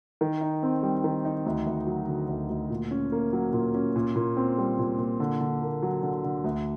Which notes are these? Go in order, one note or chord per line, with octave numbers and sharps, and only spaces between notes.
D#3
D#4
C4
G3
D#3
D#4
D2
D2
F#3
D3
D2
D2
A#2
C#4
A#3
F#3
A#2
C#4
A#2
A#2
C4
G3
A#2
A#2
D3
D3
A#3
F#3
D3
D3
D2